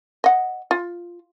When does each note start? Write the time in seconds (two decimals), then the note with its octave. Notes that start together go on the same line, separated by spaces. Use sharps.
0.24 D#5 F#5
0.71 F4